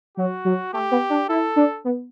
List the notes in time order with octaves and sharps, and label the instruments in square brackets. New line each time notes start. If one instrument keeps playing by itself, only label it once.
[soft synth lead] F#3 [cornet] F#4
[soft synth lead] F#3
[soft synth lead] A3 [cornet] G4
[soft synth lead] B3
D4
[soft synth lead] E4 [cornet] A4
[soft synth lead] D4
B3